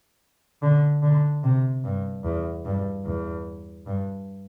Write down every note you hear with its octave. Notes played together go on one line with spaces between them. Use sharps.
D3
D3
C3
G2
E2
G2
E2
G2